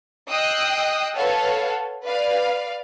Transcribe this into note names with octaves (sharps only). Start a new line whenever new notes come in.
D#5 G5 D#6 E6 F#6 C7
A4 B4 C#5 F5 F#5
B4 D5 F5